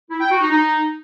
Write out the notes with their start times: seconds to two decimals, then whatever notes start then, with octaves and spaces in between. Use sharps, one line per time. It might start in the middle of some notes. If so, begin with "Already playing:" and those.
0.11 E4
0.21 G5
0.31 F#4
0.41 D#4
0.51 D#4